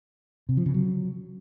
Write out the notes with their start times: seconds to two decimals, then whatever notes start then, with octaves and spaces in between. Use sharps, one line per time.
0.49 C3
0.57 F3
0.66 C#3
0.74 F#3